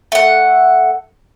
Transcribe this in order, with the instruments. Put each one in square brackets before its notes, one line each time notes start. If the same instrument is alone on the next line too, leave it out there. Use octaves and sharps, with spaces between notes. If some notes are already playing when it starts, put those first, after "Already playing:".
[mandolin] A3 F#5